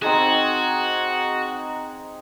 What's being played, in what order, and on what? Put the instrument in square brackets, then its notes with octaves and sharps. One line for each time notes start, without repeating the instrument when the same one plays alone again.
[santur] C4 D#4 G#4 [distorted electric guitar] F#4